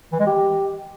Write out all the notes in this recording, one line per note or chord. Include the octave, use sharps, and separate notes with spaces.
E3
G#3
G4